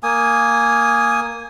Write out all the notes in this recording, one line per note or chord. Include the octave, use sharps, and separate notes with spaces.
A#3 G#5 D#6